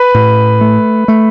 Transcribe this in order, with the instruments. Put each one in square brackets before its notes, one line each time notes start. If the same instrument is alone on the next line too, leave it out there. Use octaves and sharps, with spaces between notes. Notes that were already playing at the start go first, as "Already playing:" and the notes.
Already playing: [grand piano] B4
[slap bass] A2
A3
A3